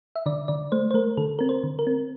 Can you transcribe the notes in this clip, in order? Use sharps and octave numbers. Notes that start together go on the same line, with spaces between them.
E5
D3 D5
D3 D5
A3 C5
C5
A3 A#4
D3 A4
C4 A#4
C5
D3
A#4
C4